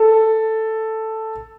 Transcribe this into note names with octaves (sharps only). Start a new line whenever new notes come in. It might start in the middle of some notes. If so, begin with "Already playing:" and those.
Already playing: A4